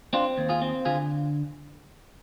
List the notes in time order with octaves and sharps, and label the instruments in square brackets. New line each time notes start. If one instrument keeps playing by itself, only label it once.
[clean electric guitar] C4 D4 F4
D#2
F4 G#4
C4
D3 F4 G#4